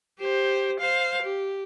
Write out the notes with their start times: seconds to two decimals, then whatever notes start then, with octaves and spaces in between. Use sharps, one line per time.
0.19 G4 C5
0.80 C5 F5
1.22 G4